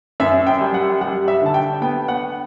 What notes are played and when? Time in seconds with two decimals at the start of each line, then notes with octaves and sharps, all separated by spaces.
0.20 F#2 E5
0.47 G5
0.61 G3
0.74 F#5
1.01 G3 F#5
1.28 E5
1.42 D3 A5
1.54 G5
1.82 B3 G5
2.08 F#5